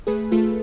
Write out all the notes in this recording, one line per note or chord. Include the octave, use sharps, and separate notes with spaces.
A3 G#4 B4
A3 F4 A4